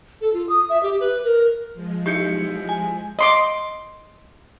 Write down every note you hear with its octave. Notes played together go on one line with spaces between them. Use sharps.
A4
F4
D#6
E5
G4
B4
A#4
F3 G#3
B1 D#4 E4 G4 G6 C#7
G#5
D#5 C6 D6